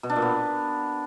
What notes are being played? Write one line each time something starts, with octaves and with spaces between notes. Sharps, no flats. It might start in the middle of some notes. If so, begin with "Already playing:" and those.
B2
D4
A#2
B3